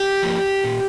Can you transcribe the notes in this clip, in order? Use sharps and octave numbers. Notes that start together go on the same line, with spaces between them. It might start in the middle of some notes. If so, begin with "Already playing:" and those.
Already playing: G4
F3 A#3
A#2